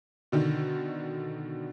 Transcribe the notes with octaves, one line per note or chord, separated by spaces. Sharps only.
B2 D3 D#3